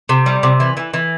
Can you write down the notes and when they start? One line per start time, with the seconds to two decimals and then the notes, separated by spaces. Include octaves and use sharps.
0.09 C3
0.26 G3
0.43 C3
0.60 E3
0.77 E3
0.94 E3